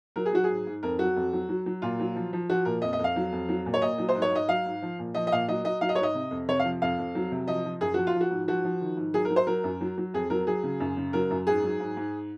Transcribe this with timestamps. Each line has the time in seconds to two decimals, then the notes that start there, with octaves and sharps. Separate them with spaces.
0.16 F#3 A#4
0.26 G#4
0.33 F#3 F#4
0.44 G#4
0.49 G#2
0.67 G#2
0.83 F2 A#4
0.99 F#3 F#4
1.16 F2
1.33 F#3
1.49 F#3
1.66 F#3
1.82 A#2 F4
2.00 F#3
2.15 F3
2.33 F3
2.50 F3 F#4
2.65 A#2 A#4
2.82 F2 D#5
2.93 D#5
2.99 F2
3.04 F5
3.16 F#3
3.32 F2
3.49 F#3
3.66 A#2
3.74 C#5
3.82 A#2 D#5
3.98 F#3
4.09 C5
4.15 G#2
4.22 C#5
4.32 G#2 D#5
4.48 F#3 F5
4.66 G#2
4.82 F3
4.99 A#2
5.14 F3 D#5
5.27 D#5
5.32 A#2 F5
5.48 F#3 D#5
5.64 F#3 D#5
5.81 F#3 F5
5.89 D#5
5.95 G#2 C#5
6.03 D#5
6.15 C3
6.31 F2
6.48 C3 C#5
6.59 F5
6.64 F3
6.82 F2 F5
6.98 F2
7.15 F#3
7.32 C3
7.48 F3 D#5
7.65 F3
7.81 F#2 G#4
7.94 F3 F#4
8.07 F4
8.15 F3
8.21 F#4
8.31 G#2
8.48 F3 F#4
8.65 F3
8.81 D#3
8.97 G#2
9.14 F#3 G#4
9.25 A#4
9.30 F#3
9.36 C5
9.47 F#3 A#4
9.64 F#2
9.81 F#3
9.98 F#3
10.14 F2 G#4
10.30 F#3 A#4
10.47 F#3 G#4
10.63 C#3
10.80 F#2
10.97 C#3
11.13 F#3 A#4
11.30 F#2
11.47 G#2 G#4
11.63 F#3
11.80 G#2
11.97 G#2